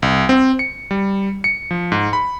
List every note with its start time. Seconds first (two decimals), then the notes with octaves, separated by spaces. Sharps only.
0.02 C2
0.29 C4
0.59 C#7
0.91 G3
1.44 C#7
1.71 F3
1.92 G#2
2.13 B5